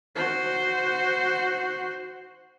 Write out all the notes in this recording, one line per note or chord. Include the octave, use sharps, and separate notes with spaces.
F#4 C5